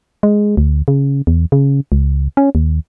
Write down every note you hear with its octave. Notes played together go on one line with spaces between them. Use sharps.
G#3
D2
C#3
E2
C#3
C#2
C#4
D#2